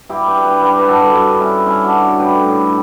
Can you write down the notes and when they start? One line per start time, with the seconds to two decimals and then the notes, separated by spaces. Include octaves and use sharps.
0.09 G2 E4 G4
0.28 G4 B4
0.37 G2
0.45 G4 B4
0.62 G2 G4 B4
0.79 B4
0.88 G2 F#4 A4
1.15 G2
1.41 G2 C#4 E4
1.66 G2 C#4 E4
1.84 D4 F#4
1.93 G2
2.19 A2 G4 B4
2.46 A2